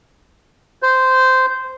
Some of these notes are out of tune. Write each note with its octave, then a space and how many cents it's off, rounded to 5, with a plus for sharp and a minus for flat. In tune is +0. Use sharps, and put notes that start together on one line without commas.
C5 -10